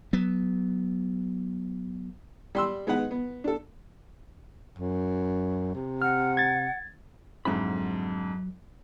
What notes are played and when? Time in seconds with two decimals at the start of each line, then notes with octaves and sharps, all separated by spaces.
0.13 F#3 B3
2.55 G3 C6 E6
2.87 G#3 B3 D#4 B4 F#5
3.11 B3
3.44 D4 A4
4.79 F#2
5.74 C3
6.02 F#5 F6
6.37 G#6 A6
7.45 F2 G#2 D3 F#3 E4 B5